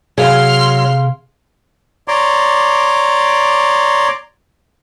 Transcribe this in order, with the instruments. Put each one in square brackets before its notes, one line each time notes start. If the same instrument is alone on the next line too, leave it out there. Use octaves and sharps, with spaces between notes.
[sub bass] C3 [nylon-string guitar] F#3 [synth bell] G#4 F5 [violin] C6 F6
[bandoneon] C#5 D5 A#5 C6 D6